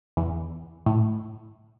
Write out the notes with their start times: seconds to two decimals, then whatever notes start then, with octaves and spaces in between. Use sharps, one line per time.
0.17 E2
0.86 A2